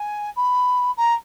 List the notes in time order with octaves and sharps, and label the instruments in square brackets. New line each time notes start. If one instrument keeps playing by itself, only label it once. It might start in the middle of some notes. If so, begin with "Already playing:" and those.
Already playing: [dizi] G#5
B5
A#5